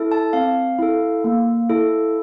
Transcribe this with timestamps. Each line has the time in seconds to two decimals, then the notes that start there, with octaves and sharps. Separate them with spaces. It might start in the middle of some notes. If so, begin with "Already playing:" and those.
Already playing: E4 A4
0.12 A5
0.33 C4 F5
0.79 E4 A4
1.24 A#3
1.70 E4 A4